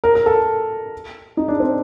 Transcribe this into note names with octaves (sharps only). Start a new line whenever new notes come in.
A#4
A#4
A4
D#4
D4
C4